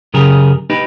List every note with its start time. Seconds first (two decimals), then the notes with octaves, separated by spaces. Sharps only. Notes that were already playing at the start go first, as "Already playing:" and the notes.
0.14 F#2 C#3 G4 G#4 A#4
0.70 D#4 G4 B4